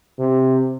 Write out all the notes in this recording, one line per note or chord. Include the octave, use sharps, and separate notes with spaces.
C3